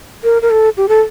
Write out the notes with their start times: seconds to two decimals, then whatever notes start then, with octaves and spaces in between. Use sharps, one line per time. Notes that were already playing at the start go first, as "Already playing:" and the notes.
0.24 A#4
0.42 A#4
0.51 A4
0.77 G4
0.89 A4